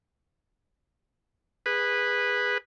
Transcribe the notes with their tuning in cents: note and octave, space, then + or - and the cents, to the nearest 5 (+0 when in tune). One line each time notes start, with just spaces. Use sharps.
G#4 -20 B4 -5